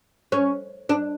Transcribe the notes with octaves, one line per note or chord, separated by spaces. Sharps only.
C#4
D4